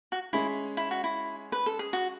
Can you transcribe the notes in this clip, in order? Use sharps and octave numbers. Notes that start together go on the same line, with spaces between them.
F#4
G#3 C#4 E4 G#4
E4
F#4
E4
B4
A4
G#4
F#4